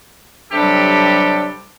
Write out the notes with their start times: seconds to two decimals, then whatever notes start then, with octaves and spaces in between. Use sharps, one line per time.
0.52 C3 F#3 G3 D4 G4 A4